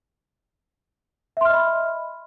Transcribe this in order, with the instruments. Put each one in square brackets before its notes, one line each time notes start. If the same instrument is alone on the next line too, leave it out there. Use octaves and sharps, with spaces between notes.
[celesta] E5
C6
F6
D#5
B5